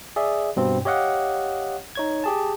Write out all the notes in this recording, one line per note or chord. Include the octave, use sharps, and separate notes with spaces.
G#4 D5 E5
G2 B2 C4
G4 C#5 D#5 F5 F#5
D#4 C#5 G#6
G4 G#4 A5